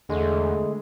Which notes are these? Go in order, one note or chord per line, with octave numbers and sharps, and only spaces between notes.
E2 D3 G#3 A3